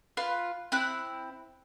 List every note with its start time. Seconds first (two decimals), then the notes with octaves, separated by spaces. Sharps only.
0.17 F4 B4
0.72 C4 E4 F#6